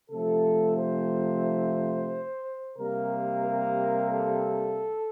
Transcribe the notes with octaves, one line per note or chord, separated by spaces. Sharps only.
C3 F3 A3 A4
C5
C3 G3 A#3 A#4
A#4
A4